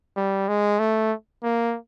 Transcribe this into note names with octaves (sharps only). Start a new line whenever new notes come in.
G3
G#3
A3
A#3